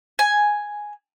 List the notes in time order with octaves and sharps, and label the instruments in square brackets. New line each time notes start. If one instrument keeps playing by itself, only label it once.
[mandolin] G#5